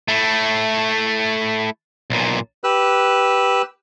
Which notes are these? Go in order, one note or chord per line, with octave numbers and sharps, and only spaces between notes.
A3 E4
B1 A#2
G4 B4 E6 F#6